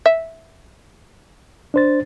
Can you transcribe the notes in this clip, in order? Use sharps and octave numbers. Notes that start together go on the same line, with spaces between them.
E5
D4 C5 A6